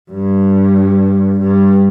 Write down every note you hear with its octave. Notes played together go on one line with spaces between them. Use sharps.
G2
G2